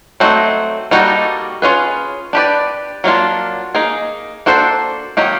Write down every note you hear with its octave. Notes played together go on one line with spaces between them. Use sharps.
F#3 A3 C4 D#4 F#4
G3 A#3 D#4 F#4 A4
C#4 F4 G#4 B4
D4 G4 B4 D5
F#3 A#3 D4 F4
A#3 D#4 G#4
A#3 D4 F#4 A4 C5
D#3 F#3 A#3 D#4 G4